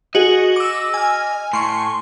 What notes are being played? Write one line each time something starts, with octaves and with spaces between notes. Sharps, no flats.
F#4 G#4 D#5
D6 E6
G#5 F6
A2 C6 C#6